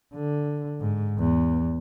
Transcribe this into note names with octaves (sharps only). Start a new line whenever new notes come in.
D3
G#2
E2